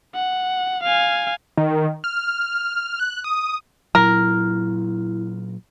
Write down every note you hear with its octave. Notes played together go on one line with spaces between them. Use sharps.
F#5
F5 G#5
D#3
F6
F#6
D#6
A#2 F#3 E4 A#4